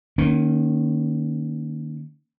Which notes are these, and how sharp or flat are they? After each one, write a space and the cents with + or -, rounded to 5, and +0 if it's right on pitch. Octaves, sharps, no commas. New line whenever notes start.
D#3 -25 A#3 +0 C#4 +0